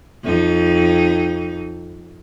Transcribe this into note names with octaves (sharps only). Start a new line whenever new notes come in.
F2 D#4